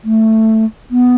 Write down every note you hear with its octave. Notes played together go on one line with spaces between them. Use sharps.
A3
B3